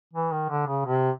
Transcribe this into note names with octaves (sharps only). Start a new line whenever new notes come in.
E3
D#3
D3
C#3
C3